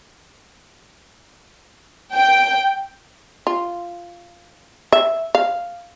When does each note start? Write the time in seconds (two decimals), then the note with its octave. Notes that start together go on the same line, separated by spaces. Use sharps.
2.14 G5
3.47 F4
4.92 E5
5.35 F5